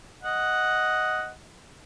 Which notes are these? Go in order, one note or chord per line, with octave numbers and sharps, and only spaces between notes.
D#5 F#5